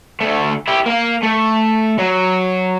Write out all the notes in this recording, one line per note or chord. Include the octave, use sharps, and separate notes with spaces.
D2 A3
E4 G4
A#3 F5
A3
F#3